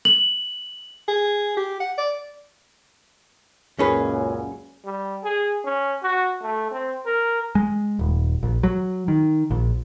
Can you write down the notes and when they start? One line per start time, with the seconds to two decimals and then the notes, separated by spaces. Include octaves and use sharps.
0.05 F#7
1.08 G#4
1.57 G4
1.80 F#5
1.98 D5
3.79 C#2 F#2 A#2 C#4 G#4 B4
4.85 G3
5.24 G#4
5.65 C#4
6.03 F#4
6.42 A3
6.71 C4
7.06 A#4
7.55 G#3
7.99 D#1
8.43 A#1
8.63 F#3
9.08 D#3
9.51 A#1